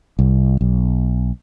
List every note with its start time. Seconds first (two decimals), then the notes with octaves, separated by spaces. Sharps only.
0.19 C2
0.61 B1